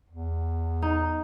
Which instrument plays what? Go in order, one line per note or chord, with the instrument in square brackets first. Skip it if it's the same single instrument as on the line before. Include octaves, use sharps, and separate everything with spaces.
[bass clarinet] E2
[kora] D#4